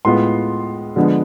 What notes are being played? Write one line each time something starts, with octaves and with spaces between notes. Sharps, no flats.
A2 G#3 B3 F4 C6
D3 F3 G#3 B3